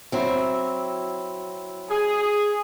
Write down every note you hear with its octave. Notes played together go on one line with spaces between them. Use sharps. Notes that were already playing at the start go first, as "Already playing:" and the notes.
F#3 C4 E4
G#4